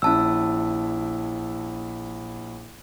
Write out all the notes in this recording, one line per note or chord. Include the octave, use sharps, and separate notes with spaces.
A#1 C#4 E4 A5 E6